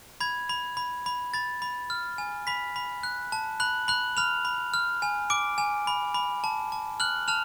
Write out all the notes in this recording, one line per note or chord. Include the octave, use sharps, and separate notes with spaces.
B5 G#6
B5
B5
B5
B5 A6
B5
F6
G#5
B5 B6
B5
F#6
A5
B5 F#6 F#7
B5 F#6 F#7
B5 F6 F7
B5
F6
G#5
D6 D7
G#5
B5
B5
A5
A5
F6 F#6 F#7
A5 F6 F7